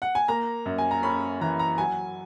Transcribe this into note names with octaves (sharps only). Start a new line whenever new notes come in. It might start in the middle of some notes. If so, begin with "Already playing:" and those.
F#5
G#5
A#3 A#5
F#2
G#5
A#5
C#4 B5
E3 A#5
A#5
F#3 G#5